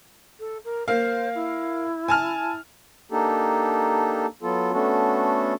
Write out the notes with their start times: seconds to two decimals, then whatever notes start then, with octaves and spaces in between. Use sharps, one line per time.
0.40 A4
0.65 A#4
0.88 A#3 C5 F5
1.35 E4
2.08 G#5 A5 F6
3.12 A#3 D4 D#4 G4 A4
4.42 F#3 B3 F4 A4
4.73 A3 B3 C#4 D4 F#4 A4